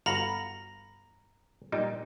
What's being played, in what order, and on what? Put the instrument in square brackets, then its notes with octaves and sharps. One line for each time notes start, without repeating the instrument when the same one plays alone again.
[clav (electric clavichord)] G1 F#4 F5 [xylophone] A#5 B5 A#6
[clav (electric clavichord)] A#2 G3 D#4